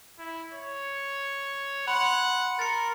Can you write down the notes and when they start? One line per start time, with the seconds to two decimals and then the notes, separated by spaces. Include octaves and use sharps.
0.19 E4
0.53 C#5
1.88 F#5 B5 C6
2.59 A#4 A6 C#7